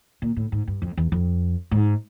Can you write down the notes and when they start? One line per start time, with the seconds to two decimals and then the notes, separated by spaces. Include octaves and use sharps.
0.22 A#2
0.36 A2
0.52 G#2
0.68 G2
0.82 F2
0.97 E2
1.12 F2
1.71 G#2